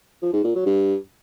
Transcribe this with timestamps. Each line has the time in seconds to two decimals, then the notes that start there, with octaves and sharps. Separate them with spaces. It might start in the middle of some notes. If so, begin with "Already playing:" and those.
0.22 F3
0.33 G#2
0.44 A#2
0.55 F#3
0.66 G2